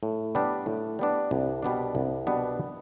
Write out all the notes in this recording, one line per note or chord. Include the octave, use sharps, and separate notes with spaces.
A2
G3 B3 D4
A2
G3 B3 D4
C2
B2 G3 B3 D4
C2
B2 G3 B3 D4